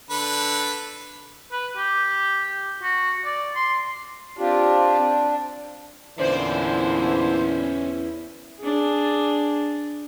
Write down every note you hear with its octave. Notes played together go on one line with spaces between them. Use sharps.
D3 A4 B4
B4
G4
F#4
D5
C6
C4 D4 F4 G4
E2 A#2 D3 E3 C#4 E4 C5 D5
D4 G#4